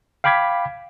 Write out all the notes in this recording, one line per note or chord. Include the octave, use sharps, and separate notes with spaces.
F5 G5 B5 D6 G#6 B6